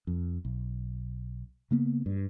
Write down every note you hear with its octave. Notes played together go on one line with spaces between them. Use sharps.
F2
B1
C#3 A#3 B3
G2